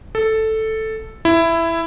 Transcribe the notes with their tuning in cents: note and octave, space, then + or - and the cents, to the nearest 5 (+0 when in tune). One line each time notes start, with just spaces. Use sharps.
A4 +0
E4 +10